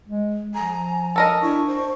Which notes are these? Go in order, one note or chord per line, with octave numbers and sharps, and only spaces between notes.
G#3
F3 G#5 A#5
A4 A#4 D#5
D4 E4 C#6
C5